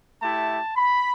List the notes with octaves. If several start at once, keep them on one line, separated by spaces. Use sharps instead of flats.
A3 E4 G4 A5
B5